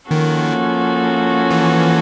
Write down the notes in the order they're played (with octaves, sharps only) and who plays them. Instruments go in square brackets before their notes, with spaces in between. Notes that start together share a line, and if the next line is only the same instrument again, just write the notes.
[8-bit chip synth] D#3 [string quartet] F3 A#3 C#4 F#4 A4
[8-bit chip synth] E3